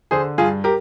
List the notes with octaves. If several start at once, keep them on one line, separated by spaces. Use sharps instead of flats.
D3 G#4 C5
G2 F4 G#4
G4 A#4